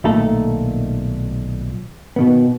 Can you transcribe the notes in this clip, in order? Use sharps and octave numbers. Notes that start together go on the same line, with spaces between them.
B1 A#2 D#3 A3 A4 A#5
B2 D#3 B3